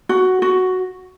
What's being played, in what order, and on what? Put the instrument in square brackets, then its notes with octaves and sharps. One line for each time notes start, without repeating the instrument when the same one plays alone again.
[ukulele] F#4
F#4